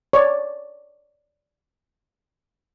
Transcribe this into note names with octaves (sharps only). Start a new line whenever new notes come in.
C#5 D5